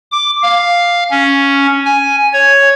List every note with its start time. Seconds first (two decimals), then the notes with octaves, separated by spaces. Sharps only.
0.12 D6
0.43 F5
1.11 C#4
1.85 G#5
2.33 C#5